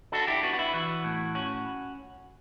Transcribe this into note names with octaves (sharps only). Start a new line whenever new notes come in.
D4 F#4 A4
E4 G4
B3 F#4
F#4
E4
E3 F#4
A2
C#4 F#4